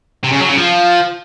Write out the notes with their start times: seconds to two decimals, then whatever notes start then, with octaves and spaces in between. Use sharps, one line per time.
0.24 C3
0.32 C#3
0.41 F#3
0.49 C#3
0.58 F3